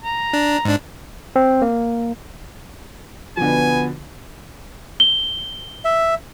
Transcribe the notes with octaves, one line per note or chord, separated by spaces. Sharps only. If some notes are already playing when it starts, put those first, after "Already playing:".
A#5
D4
G#2 D4
C4
A#3
B2 D3 F3 B3 G#5
G7
E5